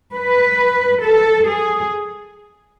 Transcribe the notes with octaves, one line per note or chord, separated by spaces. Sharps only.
B4
A4
G#4